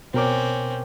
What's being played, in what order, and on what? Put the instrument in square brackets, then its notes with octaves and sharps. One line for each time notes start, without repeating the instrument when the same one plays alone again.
[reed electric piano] B2 A#4 D6 [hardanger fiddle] C4 C#4